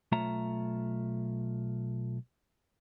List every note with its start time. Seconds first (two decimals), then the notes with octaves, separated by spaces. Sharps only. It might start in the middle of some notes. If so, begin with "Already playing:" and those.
0.12 B1 A3 F4 C#5 E5 A#5